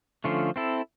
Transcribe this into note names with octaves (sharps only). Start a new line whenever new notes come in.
D3 F3 A3 C#4 F4
C4 E4 A4